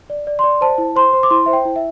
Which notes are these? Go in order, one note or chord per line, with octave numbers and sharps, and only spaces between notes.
D5
D5
D5 C6
C5 A5
E4
C5 C6
C5
D6
E4 C6
C5 E5
G5
E4
E5